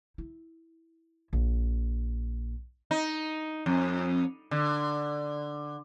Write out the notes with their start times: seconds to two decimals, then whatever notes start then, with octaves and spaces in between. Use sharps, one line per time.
0.18 E4
1.33 A#1
2.91 D#4
3.66 F2
4.51 D3